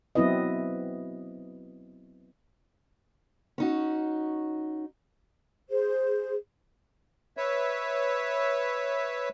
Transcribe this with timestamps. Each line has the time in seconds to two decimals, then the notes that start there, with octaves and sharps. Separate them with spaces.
0.15 F#3 B3 C4 E4 B4 D#5
3.58 C#4 D#4 F#4
5.70 G#4 C5
7.37 B4 C#5 E5